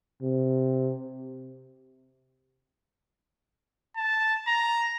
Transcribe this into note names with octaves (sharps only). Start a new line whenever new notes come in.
C3
A5
A#5